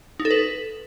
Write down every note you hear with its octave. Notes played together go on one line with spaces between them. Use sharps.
D#4
A4
B4